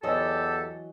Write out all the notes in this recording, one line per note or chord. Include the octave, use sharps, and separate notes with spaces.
E2 E3 F#3 G4 A4 D#5